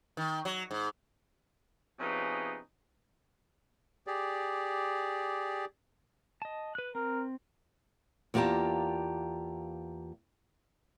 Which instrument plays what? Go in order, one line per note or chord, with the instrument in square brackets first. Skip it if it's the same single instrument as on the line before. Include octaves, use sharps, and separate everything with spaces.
[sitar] D#3
F#3
G#2
[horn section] C3 F3 B3 C#4 D#4 G#4
[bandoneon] G4 G#4 D5
[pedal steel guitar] D#5 A5
B4 F#6
[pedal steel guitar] C4 [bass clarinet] A#4
[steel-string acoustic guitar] E2 A#3 F4 G4 A5 A#5